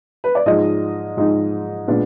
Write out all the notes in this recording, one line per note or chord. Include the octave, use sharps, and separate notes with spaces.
B4
D5
G#2 F3 G#3 D#4 D#5
G#2 F3 G#3 D#4
A#2 G#3 B3 D4